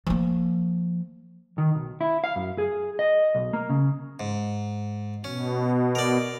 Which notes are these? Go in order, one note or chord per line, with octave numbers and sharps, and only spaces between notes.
F3 A#3
D#3
B1
E4
F5
F#2
G#4
D#5
B1
A#3
C#3
G#2
B2 C#4
A#4 D5